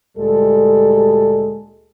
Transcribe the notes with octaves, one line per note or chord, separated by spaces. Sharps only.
D2 A#2 G3 G#3 A4